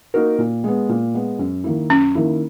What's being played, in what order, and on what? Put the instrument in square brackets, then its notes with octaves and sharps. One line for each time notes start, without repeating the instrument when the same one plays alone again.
[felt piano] A#3 D#4 F#4 A#4
A#2
G#3 B3
A#2
G#3 B3
F#2
D#3 A#3 E4
[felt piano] F#2 [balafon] C#4
[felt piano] D#3 A#3 E4